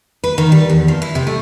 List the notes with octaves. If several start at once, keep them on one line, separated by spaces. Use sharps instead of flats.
B4
D#3
G3
E2
F3
E4
C3
A3